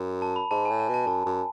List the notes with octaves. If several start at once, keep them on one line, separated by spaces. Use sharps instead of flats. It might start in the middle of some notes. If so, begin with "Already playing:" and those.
Already playing: F#2
A5
B5
G#2 A5
A2 G#5
A5
B2
A5
F#2 A5
F#2